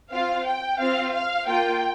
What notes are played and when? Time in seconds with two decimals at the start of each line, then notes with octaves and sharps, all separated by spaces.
0.12 C4 F4 F5
0.46 G5
0.79 C4 F4 F5
1.14 F5
1.47 A#3 F4 G5